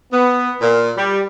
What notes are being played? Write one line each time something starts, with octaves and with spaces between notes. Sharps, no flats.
B3
A#2
G3